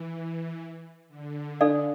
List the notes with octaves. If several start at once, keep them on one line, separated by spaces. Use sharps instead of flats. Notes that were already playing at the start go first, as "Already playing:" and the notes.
Already playing: E3
D3
D4 A4 D5 F5